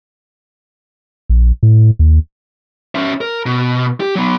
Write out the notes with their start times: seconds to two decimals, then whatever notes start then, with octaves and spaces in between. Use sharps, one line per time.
1.30 A#1
1.63 A2
1.99 D#2
2.95 C#4 E5
3.21 A#4
3.46 B2
4.00 G4
4.16 F#3 B3